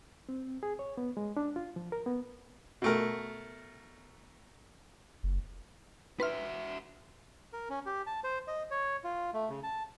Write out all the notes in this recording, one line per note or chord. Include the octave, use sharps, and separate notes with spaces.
C4
G#4
C#5
B3
G#3
D4
F4
F3
A#4
B3
B2 A3 A#4
F#1
F#4 B4 E5 C6 F6
A#4
C#4
G4
A5
C5
D#5
C#5
F4
A3
C#3
A5